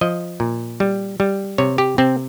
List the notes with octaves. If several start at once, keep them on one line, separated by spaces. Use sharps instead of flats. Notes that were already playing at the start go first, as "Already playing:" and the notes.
F3 D#5
A#2
G3
G3
C3 C#5
G4
C3 C4